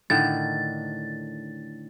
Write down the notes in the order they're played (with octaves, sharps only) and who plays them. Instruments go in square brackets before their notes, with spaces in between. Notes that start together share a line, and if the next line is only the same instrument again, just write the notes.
[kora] A2 D3 D#3 [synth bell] A6